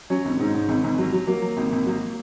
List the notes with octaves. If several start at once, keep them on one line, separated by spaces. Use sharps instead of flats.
F#3 C#4
G#1
G#2
G#2
G#1
G#1
F#3
F#3
F#3 A#3
F#3
G#1
G#1
F#3